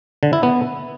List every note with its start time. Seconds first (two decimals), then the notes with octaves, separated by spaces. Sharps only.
0.23 D3
0.33 E4
0.43 B3